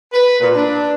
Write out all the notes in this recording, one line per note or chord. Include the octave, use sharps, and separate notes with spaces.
B4
A#2
D4